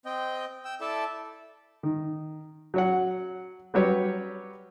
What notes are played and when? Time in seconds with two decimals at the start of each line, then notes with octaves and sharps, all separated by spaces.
0.05 C4 D#5 G5
0.65 G5 E6
0.81 E4 A4 D5 E5 A5
1.83 D#3
2.74 F#3 C#5 F#5
3.74 F#3 G3 F#4 G4 B4 C#5